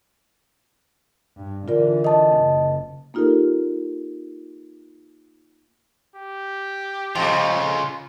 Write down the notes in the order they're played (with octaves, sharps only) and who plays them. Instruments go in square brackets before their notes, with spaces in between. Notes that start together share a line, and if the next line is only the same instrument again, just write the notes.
[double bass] G2
[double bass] D3 E3 [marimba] F4 A#4 D5
[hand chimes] D#5 A5
[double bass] F#1 C#3
[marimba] A#3 D#4 F4 G4 A4 A#4
[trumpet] G4
[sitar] F2 [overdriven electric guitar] C#3 F4